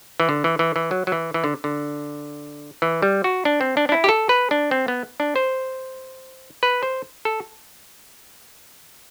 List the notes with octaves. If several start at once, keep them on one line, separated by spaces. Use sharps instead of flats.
E3
D3
E3
E3
E3
F#3
F#3
E3
E3
D3
D3
E3
G3
F#4
D4
C4
D4
D4
E4
G4
A4
B4
D4
C4
B3
D4
C5
B4
C5
A4